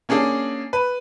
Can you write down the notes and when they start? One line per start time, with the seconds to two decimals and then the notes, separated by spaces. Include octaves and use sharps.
0.09 A#3 C#4 D4 G#4
0.73 B4